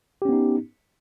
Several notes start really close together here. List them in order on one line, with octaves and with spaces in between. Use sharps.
G4 C#4 B3 D#4